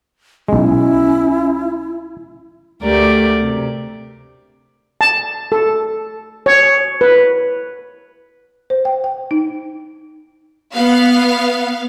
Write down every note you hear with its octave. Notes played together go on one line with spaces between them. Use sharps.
B1 G#3 C#4 E4
D2 A3 G4 A#4 D5
C3
A5
A4
C#5
B4
C5
G5
G5
D#4
B3 F5